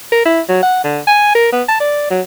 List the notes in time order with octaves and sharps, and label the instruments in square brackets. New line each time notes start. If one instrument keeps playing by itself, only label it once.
[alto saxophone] A#4
E4
F#3
F#5
D3
G#5
A#4
B3
A5
D5
F#3